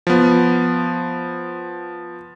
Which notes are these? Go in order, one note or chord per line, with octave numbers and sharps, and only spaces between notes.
F3 B3